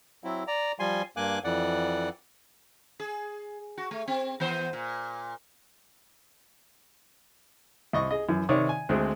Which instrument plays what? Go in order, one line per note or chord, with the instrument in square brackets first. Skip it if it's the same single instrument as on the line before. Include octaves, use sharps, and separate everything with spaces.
[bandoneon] F#3 C4 E4
D5 A#5
F3 G3 G#5 C6
G2 A#3 G#5 D6 F#6
F2 E3 D5 F#5
[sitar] G#4
F#4
A3
C4
E3 B3 C5
A#2
[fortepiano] C2 D#5 C#6
G#4 D#5
F#2 E3
C3 D#3 C#5 D5 D#6
G#5
D2 G#3 C4 G#4